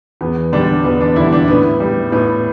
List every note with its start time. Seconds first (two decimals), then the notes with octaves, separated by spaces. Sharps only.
0.21 E2 B3
0.52 D3 G3 D4
0.84 E2 B3
1.01 D4
1.16 D3 G3 E4
1.33 D4
1.48 A2 B3
1.80 G3
2.12 A2 B3